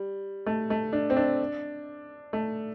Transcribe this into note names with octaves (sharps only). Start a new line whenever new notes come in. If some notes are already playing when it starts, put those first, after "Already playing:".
Already playing: G3
A3
A3
D4
C4
D4
A3